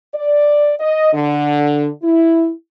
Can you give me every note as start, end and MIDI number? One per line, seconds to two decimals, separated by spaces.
0.15 0.73 74
0.80 1.11 75
1.13 1.88 50
2.03 2.51 64